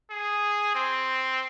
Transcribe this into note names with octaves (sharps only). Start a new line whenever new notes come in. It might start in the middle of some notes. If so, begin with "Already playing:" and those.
G#4
C4